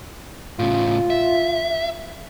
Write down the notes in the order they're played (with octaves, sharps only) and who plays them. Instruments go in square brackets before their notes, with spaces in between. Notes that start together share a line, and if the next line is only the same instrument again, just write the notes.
[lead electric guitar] A2 C#3 [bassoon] F4
[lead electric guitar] E5